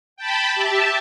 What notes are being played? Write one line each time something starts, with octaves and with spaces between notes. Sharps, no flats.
G5 A5 B5
G4 E5 A5